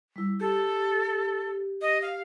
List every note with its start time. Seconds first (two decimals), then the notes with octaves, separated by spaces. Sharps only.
0.16 G3 E4
0.40 G4 A4
1.81 D#5
2.02 F5